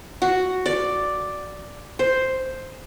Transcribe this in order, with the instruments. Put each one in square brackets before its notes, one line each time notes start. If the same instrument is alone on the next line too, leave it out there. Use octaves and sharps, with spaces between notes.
[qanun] F#4
D5
C5